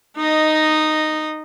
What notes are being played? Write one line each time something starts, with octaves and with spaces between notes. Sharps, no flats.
D#4 D#5